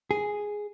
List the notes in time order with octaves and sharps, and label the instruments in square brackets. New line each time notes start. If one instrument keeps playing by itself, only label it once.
[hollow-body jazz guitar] G#4